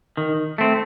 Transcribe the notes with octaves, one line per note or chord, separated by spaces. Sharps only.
D#3
A3 C4